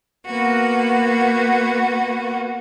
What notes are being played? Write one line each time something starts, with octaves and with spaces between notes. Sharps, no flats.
A#3 B3 F#4